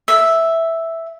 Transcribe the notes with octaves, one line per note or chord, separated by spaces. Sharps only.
E5